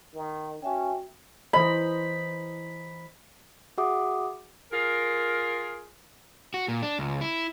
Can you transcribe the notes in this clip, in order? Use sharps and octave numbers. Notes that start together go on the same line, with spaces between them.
D#3
C#4 F#4 E5 G5
E3 C5 D#5 B5
F#4 G#4 E5 F#5 D6 D#6
F4 G#4 A#4
F#4
A#2
D4
C#2
E4